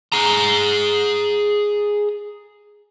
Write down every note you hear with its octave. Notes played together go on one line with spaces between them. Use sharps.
G#4 A#5